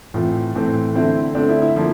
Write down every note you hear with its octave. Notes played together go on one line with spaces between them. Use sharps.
A2 E3 A3 C4 F4
A2 E3 A3 C4
D3 A3 C4 E4
D3 A3 C4 D4
E4
E4
D3 F3 A#3 E4